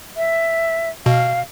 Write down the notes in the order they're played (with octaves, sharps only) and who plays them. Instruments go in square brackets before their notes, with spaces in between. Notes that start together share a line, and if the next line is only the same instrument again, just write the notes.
[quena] E5
[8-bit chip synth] B2 [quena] F5